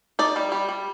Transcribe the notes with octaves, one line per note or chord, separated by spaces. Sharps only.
D#4 D5
G3
G3
G3